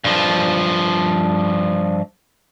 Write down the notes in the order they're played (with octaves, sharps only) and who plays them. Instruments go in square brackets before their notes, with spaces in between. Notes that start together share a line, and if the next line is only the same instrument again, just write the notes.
[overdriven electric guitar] G2 F3